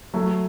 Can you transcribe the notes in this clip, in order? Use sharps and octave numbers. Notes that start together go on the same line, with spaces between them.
F#3 A3